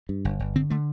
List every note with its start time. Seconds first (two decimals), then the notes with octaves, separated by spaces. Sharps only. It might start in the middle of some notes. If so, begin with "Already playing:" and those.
0.09 G2
0.25 G1
0.40 G1
0.55 D3 C4
0.70 D3 A3